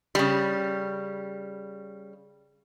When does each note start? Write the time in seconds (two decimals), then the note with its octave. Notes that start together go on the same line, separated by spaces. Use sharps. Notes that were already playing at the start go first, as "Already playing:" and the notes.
0.15 C#3 G3